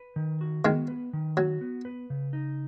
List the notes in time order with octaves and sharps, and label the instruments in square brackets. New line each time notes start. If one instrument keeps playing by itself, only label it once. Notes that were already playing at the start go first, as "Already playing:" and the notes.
Already playing: [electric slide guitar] B4
D#3
F#4
[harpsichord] D#3 G#3 [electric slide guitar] B3
[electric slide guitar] B4
D#3
[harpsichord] F#3 [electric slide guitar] F#4
[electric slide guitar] B3
B4
C#3
D#4